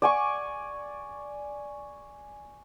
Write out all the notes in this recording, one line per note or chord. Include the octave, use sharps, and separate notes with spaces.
D5 G#5 C#6